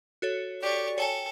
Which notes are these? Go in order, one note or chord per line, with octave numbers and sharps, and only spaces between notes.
F#4 A4 C#5
G4 D5 C#6
A4 C#5 G5 G#5